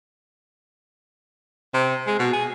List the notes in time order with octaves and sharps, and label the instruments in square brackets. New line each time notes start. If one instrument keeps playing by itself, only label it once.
[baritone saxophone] C3
G#3
B2
G#4